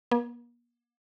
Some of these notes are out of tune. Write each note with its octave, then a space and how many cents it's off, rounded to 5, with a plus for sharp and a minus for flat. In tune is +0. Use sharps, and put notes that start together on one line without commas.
A#3 +45